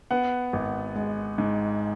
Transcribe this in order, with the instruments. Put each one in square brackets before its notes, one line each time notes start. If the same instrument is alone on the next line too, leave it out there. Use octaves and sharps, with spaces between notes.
[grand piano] B3 F#5
G#1
G#3
G#2